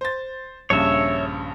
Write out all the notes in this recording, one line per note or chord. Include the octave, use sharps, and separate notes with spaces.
C5 A6
A#1 G2 C#3 C#5 E5